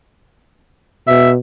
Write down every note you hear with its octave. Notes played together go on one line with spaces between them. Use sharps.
B2 E5